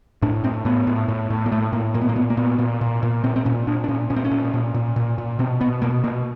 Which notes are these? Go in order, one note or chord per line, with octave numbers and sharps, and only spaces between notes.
A2 D4
A2 C4
A2 B3
A2
A2
A2
A#3
A2 A3
A2 A#3
A#2 A#3
B3
A#3
A#2 B3
A#3
A#2 B3
A#2
A#2
A#2
A#2 C4
C4
A#2 C#4
A#2 D4
D4
A#2 C#4
A#2 C#4
C4
C#4
A#2
A#2
A#2
A#2
A#2
B2 C4
B2 B3
B2 A#3
B2 A#3